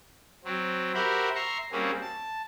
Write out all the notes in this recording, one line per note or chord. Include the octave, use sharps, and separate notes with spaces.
F#3 C4
F#4 G4 A#4 C5 E5 B5
E5 A#5 C6 C#6
G3 A#3 C4 C#4 F#4 G#4
A5